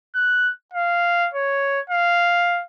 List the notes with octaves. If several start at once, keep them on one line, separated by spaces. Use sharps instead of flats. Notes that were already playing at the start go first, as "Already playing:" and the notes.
F#6
F5
C#5
F5